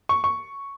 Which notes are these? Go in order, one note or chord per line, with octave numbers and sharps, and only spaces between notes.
C#6
C#6